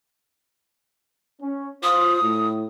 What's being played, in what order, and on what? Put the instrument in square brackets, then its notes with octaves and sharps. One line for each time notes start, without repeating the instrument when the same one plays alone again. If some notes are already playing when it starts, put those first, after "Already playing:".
[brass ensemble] C#4
[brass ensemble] F4 C5 [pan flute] D#6
[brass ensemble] A2